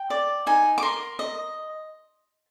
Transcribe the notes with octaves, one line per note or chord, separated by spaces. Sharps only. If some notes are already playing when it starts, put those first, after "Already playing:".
Already playing: G5
D5
D#4 G#5
D6
A#4 C6
D#5